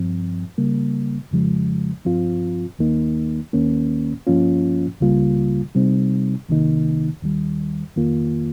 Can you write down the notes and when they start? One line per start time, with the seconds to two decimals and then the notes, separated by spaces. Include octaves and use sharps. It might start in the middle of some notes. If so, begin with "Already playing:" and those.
Already playing: G2 F3 C4
0.58 C#3 G3 A#3
1.31 F2 C#3 F3 G#3
2.05 G2 F3 C4 F4
2.79 D#2 D#3 A#3 D#4
3.53 D#2 D#3 A#3 C#4
4.27 G2 F3 A#3 C#4 F4
5.00 C#2 C#3 G3 A#3 F4
5.75 C3 G3 C4 D#4
6.49 C2 C3 D#3 A#3 D#4
7.22 D#2 D#3 G3
7.96 F2 D#3 A#3 F4